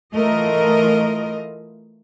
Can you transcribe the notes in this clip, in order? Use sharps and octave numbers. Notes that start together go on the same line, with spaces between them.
E3 A3 F4 A#4 D#5